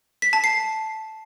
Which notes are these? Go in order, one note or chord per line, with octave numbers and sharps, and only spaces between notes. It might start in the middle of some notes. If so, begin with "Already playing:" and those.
B6
A5
C7